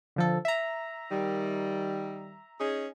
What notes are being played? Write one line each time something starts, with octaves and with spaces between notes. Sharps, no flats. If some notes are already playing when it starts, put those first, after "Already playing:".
D3 F3 A4
E5 A#5
D#3 G3
C#4 D#4 G#4